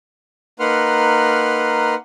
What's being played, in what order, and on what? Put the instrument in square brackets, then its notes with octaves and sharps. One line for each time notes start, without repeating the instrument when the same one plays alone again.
[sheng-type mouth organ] A#3 D#4 B4 F#5 C6 F6